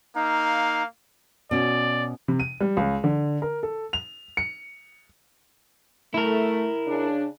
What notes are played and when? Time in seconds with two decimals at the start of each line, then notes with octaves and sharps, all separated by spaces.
0.15 A#3 D#4 F5
1.51 B2 C#4 D5
2.28 C3
2.40 D#7
2.61 G3
2.77 C#2
3.04 D3
3.42 A#4
3.63 A4
3.93 F7
4.37 C#7
6.14 A3 E4 A#4
6.87 C#3 D4